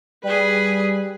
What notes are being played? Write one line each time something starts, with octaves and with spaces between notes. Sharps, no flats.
G3 G#4 B4